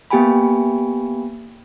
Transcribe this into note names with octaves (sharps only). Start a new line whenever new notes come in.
A#3 B3 G4 G5 G#5 B5